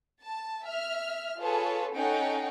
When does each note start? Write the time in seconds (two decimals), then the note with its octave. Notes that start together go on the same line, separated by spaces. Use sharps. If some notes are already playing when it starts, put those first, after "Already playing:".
0.22 A5
0.64 E5 F6
1.38 F4 G#4 A4 B4 C#5 A5
1.94 C#4 D#4 G#4 A4 F#5 G5